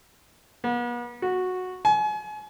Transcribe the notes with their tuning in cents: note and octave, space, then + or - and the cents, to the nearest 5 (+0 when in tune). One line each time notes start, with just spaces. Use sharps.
B3 -40
F#4 -10
G#5 +35